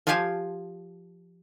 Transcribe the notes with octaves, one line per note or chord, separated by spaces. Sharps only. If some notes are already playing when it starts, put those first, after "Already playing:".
F3 F4 G4 F5 G#5 A5